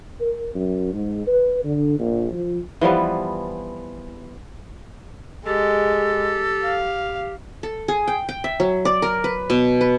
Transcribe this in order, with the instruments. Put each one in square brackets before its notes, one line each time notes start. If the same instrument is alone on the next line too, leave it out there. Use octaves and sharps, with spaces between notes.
[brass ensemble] A#4
F#2
G#2
B4
D3
A#1
F3
[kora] E3 F3 G3 B3
[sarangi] G#3 [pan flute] G4 [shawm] A4
[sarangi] F5
[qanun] A4
G#4
G5
G5
E5
F#3
D5
A#4
B4
B2
B4